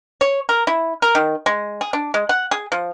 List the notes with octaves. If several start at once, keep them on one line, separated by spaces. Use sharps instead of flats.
C#5
A#4
E4
A#4
D#3
G#3
G#4
D4
G#3
F#5
G#4
F3